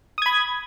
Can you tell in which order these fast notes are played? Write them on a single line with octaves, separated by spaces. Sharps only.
D#6 G#6 B5